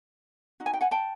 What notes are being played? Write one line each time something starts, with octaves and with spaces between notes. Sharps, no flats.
D#4 F#4
G#5
G5
F#5 G#5
G5 A5